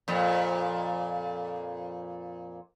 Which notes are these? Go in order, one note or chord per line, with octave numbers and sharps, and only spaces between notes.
F2 A#2